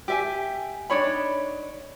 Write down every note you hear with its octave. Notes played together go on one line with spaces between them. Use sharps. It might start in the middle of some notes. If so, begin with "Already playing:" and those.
G4 E5 G#5
D4 D#4 C#5 B5